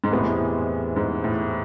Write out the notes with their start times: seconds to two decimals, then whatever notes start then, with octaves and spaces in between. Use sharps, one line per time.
0.04 G#2
0.11 E2 A2 C3 G#3 B3
0.96 G#2
1.24 A2